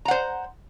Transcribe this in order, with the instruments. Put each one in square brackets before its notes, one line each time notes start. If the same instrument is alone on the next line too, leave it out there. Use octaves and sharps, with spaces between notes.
[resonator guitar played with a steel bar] A#5
F#5
C5